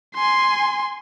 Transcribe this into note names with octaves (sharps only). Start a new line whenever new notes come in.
G#5 C6